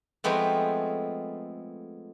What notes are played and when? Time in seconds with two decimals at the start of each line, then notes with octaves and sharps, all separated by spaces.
0.24 F3 G#3 A3 B3 C4